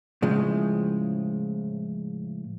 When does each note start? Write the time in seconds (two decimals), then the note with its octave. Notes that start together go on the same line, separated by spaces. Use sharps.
0.22 A2 C#3 F3 G#3